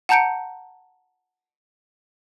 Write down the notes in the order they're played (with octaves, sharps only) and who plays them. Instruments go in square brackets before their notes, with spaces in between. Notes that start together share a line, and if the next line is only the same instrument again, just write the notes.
[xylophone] F#5 A5 A#5 G6 C#7 D7